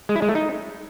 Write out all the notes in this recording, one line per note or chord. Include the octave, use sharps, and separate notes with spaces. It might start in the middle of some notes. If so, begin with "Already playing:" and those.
G#3
E4
G#3
A3
D#4